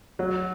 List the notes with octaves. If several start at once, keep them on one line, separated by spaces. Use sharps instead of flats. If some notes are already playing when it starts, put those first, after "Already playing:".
F#3